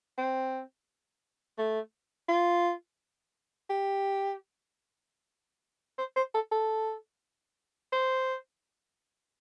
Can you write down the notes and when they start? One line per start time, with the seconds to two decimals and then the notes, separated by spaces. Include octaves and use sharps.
0.18 C4
1.58 A3
2.28 F4
3.70 G4
5.98 C5
6.16 C5
6.34 A4
6.52 A4
7.92 C5